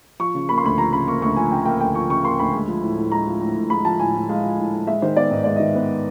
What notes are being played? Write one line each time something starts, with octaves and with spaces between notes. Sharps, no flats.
F3 C#6
C#3
A#3 B5
C6
D2 B5
F3 A#5
C#3 B5
A#3 C#6
D2 C#6
F3 G#5
C#3 G5
A#3 G5
D2 G5
F3 C#6
C#3 C#6
A#3 C6
D2 B5
G#3
F3
A2
A2
G#3 A#5
F3
A2
A2
G#3 B5
F3 A5
A2 G#5
A2
G#3 F5
F3
A2
A2
G#3 E5
D#3 C5
B3 D5
G#2 D#5
G#3 D5
D#3 D#5
B3